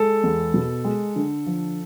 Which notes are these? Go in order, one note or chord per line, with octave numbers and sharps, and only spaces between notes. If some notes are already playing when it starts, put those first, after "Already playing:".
Already playing: G#3 A4
E2
B2
G#3
D3
F3